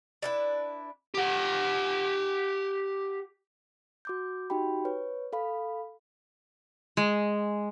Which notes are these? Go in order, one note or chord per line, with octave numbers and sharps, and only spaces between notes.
D4 E4 B4
G4 F#5
F#4 D6 G6
D#4 F#4 G4 G5 B5
B4 C#5
A4 F5 B5
G#3